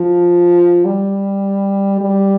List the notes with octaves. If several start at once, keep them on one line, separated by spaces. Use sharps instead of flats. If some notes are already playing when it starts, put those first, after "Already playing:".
Already playing: F3
G3
G3